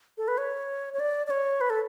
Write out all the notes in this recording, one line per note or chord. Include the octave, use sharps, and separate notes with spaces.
A4
B4
C#5
C#5
D5
D5
C#5
B4
A4